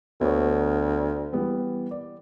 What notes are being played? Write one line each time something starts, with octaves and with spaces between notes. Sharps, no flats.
D2 B3 C#5
E3 G3 B3
D5